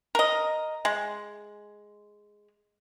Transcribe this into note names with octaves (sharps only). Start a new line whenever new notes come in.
A#4 D#5
G#3